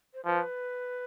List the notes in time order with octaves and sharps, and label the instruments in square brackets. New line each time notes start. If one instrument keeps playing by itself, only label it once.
[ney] C5
[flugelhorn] F3 [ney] B4